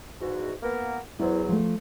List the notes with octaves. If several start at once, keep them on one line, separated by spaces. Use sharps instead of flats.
E2 G#2 F#4
A#3 B3 A#4
E2 F#3 E4 C5
F3 A3